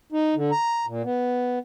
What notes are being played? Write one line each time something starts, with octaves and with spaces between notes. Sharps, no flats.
D#4
D3
A#5
A#2
B3